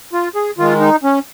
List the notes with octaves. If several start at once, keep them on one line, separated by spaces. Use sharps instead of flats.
F4
G#4
D#3 G#3 F4
D#4
C#4